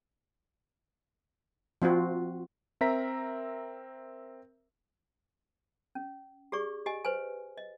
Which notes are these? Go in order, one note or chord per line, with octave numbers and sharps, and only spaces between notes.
F3 C4 F4 F#4
C4 A#4 E5 A#5 B6
C#4
G4 G#4 D5 C#6
G4 D#5 G#5
B4 C5 G#5
D#5